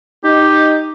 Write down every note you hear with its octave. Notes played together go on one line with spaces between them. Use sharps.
D#4 G4